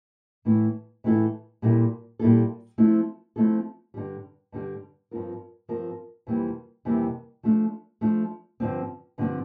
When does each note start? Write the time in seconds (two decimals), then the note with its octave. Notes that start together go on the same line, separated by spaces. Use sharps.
0.45 A2 E3 A3 E4 A4
1.04 A2 E3 A3 E4 A4
1.62 A#2 G3 A#3 E4 A4
2.19 A#2 G3 A#3 E4 A4
2.78 F3 A3 C4 E4 A4
3.36 F3 A3 C4 E4 A4
3.94 G2 D3 G3
4.52 G2 D3 G3
5.11 G2 F3 C4 F4 A#4
5.68 G2 F3 C4 F4 A#4
6.27 F2 C3 E3 G3 A#3
6.85 F2 C3 E3 G3 A#3
7.43 F3 A3 D4
8.01 F3 A3 D4
8.60 G2 D3 F3 C4
9.18 G2 D3 F3 C4